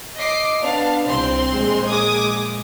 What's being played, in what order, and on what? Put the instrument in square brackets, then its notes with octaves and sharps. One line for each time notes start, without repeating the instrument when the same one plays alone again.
[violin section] D#5 D6 C7
B3 D4 F5
[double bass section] C2 [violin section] C4 C6
[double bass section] A#1 G#3
[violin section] D6 D#6 G#6